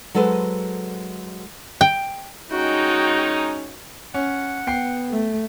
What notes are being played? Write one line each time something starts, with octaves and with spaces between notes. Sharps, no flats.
F#3 G#3 A4 B4 C5
G5
G#3 C#4 D#4 F#4 G5
C#4 F#5
B3 G5 C7
A3